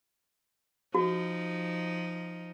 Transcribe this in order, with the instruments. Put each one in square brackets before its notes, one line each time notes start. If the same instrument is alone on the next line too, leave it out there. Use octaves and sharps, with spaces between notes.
[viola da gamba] F3 D#4 [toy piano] F#4